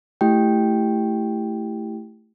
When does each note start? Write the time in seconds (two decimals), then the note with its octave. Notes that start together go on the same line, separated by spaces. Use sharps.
0.21 A3 E4 G4 G5